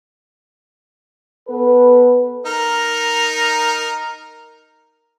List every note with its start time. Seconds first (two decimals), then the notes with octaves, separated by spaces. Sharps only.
1.48 B3 A4 B4
2.46 D#4 A#4